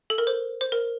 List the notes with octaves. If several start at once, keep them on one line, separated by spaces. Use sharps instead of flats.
A4
A#4
C5
C5
A#4